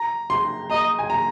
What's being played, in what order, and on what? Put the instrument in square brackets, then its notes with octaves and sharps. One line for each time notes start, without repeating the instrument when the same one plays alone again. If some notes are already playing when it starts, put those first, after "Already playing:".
Already playing: [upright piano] A#5
C6
[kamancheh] D#5 [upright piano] A#5
[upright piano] G#5
A#5